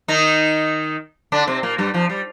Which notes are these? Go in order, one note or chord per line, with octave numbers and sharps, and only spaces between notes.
D#3 D#4
D3 D4
C3 C4
A#2 A#3
G2 G3
F2 F3
G3